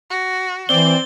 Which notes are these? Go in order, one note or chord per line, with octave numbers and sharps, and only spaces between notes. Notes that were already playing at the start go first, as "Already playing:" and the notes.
F#4
E3 C4 C5 D5 G7